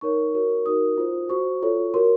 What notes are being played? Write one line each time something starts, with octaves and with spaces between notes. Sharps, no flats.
D#4 A#4 C#5 C#6
F#4 A#4 C#5
D#4 F#4 A#4 D#6
F4 C5
F#4 C5 C#6
F4 A4 C#5
F#4 A#4 C#5 C6